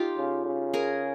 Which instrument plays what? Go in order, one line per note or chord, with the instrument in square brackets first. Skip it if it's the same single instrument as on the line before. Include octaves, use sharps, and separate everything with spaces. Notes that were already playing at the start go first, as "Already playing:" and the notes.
Already playing: [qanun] D#4 F4 G4
[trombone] C#3
C#3
[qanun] G#4 A#4